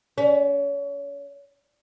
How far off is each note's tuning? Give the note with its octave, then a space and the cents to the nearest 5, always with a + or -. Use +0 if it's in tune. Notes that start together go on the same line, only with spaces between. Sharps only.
C#4 +30